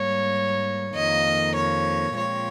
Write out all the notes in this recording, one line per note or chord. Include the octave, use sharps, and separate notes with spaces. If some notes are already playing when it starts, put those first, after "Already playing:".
Already playing: G#2 G3 A#3 C#5
F2 D#3 A#3 D#5
C#5
A#2 F3 G#3 C4 C#5